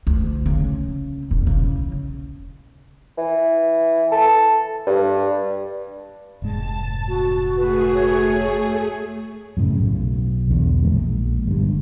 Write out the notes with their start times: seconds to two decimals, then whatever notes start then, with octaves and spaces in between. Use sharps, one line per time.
0.07 D2
0.46 C#3
1.31 E1
1.47 C#3
3.18 E3
4.12 A4
4.87 G2
6.42 F1 G#2 G#3 A5
7.08 F#4
7.57 A3 G#4 B4
7.94 C#5
9.57 F#2 A2 C#3
9.78 B1
10.50 B1 E2 D3
10.84 A#1 G#3 A#3
11.47 G1 G2